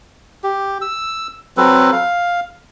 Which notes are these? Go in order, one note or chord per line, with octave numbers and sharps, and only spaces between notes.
G4
E6
F#3 C4 A4 B4
F5